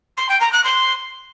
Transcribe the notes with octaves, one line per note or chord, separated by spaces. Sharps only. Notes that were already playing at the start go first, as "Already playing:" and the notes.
C6
G5
A#5
F#6
C6